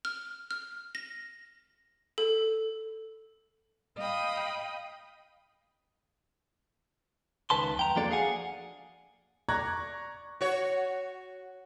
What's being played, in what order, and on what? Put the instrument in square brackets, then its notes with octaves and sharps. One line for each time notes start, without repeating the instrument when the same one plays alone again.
[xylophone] F6
F6
A#6
A4
[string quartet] D#5 F5 G5 B5 D#6
[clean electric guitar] C#2 D#3 B4 A5 C6
F2 G5 A#5
F3 A#3 D4 F#4 A4 D5
G#4 F5 F#5 G#5
[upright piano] D5 A#5 C#6 F#6 G#6 A#6
[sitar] F#4 C#5